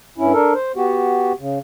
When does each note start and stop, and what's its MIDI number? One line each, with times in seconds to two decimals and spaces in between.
0.18 0.32 43
0.18 0.32 61
0.18 0.32 64
0.33 0.53 62
0.33 0.53 69
0.33 0.53 70
0.54 0.72 72
0.76 1.32 59
0.76 1.32 66
0.76 1.32 67
1.39 1.58 49